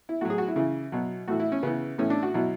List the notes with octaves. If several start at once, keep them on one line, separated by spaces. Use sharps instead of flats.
E4
A2 F#3 F#4
G#4
F#4
E4
C#3 E3
B2 F#3
A2 E3 F#4
E4
C#4
C#3 E3 B3
A2 E3 C#4
D4
F#4
B2 F#3 E4